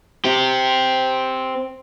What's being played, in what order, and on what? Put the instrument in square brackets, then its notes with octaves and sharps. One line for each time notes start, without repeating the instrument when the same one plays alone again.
[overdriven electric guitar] C4 G4